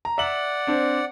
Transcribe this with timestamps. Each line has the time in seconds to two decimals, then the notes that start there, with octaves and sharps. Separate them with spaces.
0.05 A#5
0.18 D5 E5 F#5 F#7
0.67 C4 D4